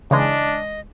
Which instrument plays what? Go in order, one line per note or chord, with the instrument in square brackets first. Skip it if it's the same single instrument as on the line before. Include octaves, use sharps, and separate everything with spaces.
[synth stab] C#3 E3 G#3 [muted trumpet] D4 [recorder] D#5